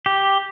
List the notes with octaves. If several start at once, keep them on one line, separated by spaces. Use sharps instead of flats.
G4